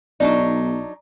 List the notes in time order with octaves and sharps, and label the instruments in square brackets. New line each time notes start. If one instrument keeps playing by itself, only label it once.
[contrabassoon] B1 [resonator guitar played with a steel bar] F#3 D4 D#4 [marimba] D5